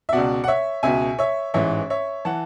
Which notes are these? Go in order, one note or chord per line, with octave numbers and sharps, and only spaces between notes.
E5
C#2 B2 D5 F#5
F#5
C#5 E5
C#2 B2 E5 G#5
C#5 E5
A1 G#2 E3 C#5 E5
C#5 E5
E3 F#5 A5